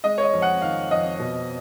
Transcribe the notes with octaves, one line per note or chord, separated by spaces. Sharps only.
G#3 D#5
C#5
D#5
F2
F#5
D#3 F5
F2 D#5
B2